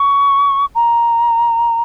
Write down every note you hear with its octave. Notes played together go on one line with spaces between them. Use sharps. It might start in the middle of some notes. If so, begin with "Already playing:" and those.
Already playing: C#6
A#5